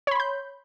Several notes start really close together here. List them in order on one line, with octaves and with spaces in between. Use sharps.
C#5 B5 C6 G6